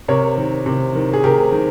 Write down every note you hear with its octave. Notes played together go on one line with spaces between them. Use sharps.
C3 A#4 C#5
D#3
C3
D#3
G#4
C3 G4 A#4
D#3